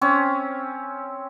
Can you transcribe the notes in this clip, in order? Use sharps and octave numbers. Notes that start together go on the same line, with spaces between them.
C4 C#4